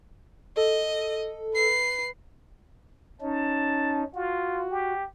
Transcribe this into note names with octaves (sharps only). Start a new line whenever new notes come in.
A4 D#5
B4 C7
C#4 D#4 A5
F4 F#4
G4